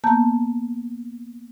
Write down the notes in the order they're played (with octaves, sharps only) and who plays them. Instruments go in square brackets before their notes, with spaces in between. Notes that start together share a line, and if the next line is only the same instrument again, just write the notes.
[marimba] A#3 B3 A5 A#5 G6